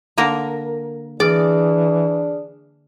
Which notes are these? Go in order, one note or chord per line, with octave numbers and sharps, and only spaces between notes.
D3 A#3 A#4
E3 D4 G#4 D5 F6